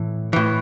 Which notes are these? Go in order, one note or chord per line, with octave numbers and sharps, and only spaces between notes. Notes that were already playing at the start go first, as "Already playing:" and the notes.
Already playing: A2 E3
A2 E3